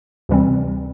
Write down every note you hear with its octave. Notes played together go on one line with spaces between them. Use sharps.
D2 C3 E3 G3 C4